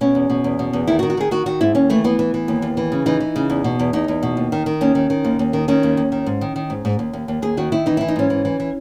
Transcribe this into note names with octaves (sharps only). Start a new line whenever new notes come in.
B2 C#4
E2
B2
E2
B2
E2
D#3 E4
F#4
D#3
F#4
D#3 G#4
D#3 F#4
D#3 F#4
G#2 E4
D#2 C#4
E3 A3
E3 B3
E3
E3
D#2
D#2
E3
C#3
E3 D#4
E3
C#3
E2
B2
E2
E2 D#4
E2
B2
D#2
D#3
D#3
D#2 C#4
D#3
D#3
D#2
D#2
D#3
D#3 C#4
D#2
D#2
D#3
G#2
D#3
D#3
G#2
G#2
D#2
D#2
D#2
D#2 G#4
D#3 F#4
D#3 E4
E3 D#4
E3 E4
D#4
G#2 C#4
E3
E3
E3